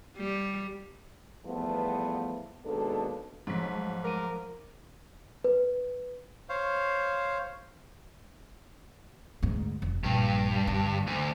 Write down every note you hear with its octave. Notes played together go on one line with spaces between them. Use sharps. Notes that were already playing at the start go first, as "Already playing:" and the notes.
G3
E2 F3 G3 A3 B3
D#2 B2 G#3 D4 A4
G#2 F3 F#3 A3 B6
A#4 D6 D#7
B4
C5 C#5 F5
D2 G#2
F1
A#1 G2 A#3
D3
D2